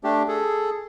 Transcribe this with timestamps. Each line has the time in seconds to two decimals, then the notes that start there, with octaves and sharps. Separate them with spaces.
0.04 A3 D4 G4
0.28 G#4 A4